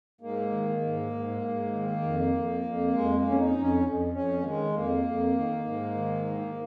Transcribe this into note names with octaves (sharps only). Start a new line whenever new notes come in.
G#2 A#3
D#3
G#2
G#2
G#2
D#3
F2
F2
F2
F2 G#3
A#3
F2
C#4
D#4
F2
C#4
F2
F2 C#4
A#3
D#3 G#3
F2 A#3
F2
D#3
G#2
D#3
D#3